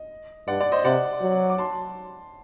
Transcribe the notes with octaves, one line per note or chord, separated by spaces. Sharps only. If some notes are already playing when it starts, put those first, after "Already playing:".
Already playing: D#5
G2 D5 F#5
D5
C5 D#5
C3 D5 F#5
F#3
D6
A5 C6